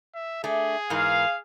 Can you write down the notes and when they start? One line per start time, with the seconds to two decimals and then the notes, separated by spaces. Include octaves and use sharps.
0.14 E5
0.44 A3 D4 G#4
0.90 G#2 E3 A#4 F5